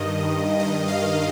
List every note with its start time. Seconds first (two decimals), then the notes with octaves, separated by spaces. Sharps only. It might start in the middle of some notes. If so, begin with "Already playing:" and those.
Already playing: G2 D#3 D#5
0.60 G2 D#3 D#5
0.88 F5